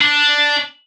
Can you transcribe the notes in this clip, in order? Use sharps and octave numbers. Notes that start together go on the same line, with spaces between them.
D4